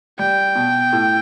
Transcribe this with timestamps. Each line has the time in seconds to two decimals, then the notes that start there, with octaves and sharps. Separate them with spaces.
0.19 G3 G5
0.56 B2
0.93 A2